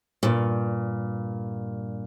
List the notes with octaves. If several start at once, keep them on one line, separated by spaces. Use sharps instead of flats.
G2 A#2